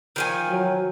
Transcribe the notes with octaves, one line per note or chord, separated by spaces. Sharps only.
D#3 F3 G#5
F#3